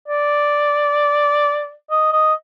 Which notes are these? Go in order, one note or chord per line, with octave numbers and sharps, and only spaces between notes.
D5
D#5
D#5